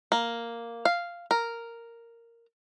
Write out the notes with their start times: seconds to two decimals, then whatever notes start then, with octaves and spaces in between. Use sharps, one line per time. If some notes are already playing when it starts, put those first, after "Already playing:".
0.12 A#3
0.85 F5
1.31 A#4